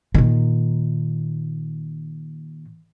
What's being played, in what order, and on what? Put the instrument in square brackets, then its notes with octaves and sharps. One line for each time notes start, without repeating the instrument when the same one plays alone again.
[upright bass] A#2 D#3